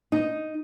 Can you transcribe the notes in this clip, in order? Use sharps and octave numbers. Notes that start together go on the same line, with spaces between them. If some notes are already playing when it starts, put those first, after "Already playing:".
D#4